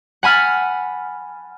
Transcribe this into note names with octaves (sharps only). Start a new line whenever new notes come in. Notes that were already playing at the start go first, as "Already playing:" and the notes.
F#5 G#5 B5 F6 A6